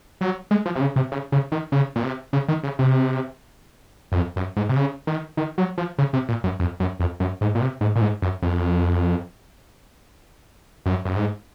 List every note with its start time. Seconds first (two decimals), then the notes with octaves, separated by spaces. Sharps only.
0.21 F#3
0.51 G#3
0.66 F3
0.75 C3
0.81 C#3
0.96 C3
1.12 C#3
1.32 C#3
1.52 D#3
1.72 C#3
1.96 A#2
2.03 C3
2.33 C#3
2.48 D#3
2.63 C#3
2.79 C3
4.12 F#2
4.15 F2
4.36 F#2
4.56 G#2
4.69 C3
4.76 C#3
5.07 D#3
5.37 D#3
5.58 F#3
5.78 F3
5.98 C#3
6.13 C3
6.29 A#2
6.44 F#2
6.60 F2
6.80 F#2
7.00 F2
7.20 F#2
7.41 G#2
7.55 A#2
7.61 C3
7.81 G#2
7.96 A#2
8.01 G#2
8.22 F#2
8.42 F2
10.86 F#2
11.05 F#2
11.16 G#2